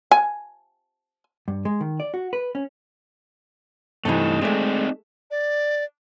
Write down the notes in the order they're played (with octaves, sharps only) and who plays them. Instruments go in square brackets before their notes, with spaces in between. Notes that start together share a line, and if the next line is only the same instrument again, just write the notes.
[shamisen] G#5
[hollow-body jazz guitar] G2
G#3
D#3
D5
F#4
B4
C#4
[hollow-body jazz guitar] G2 C3 E3 [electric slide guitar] A3 D#4
[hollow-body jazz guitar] G#3 A3 [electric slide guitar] C4 D#4 D5
[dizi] D5